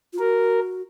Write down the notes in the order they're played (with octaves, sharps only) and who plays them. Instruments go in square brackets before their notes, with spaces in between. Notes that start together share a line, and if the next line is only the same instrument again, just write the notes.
[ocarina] F4
[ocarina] F#4 [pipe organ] A#4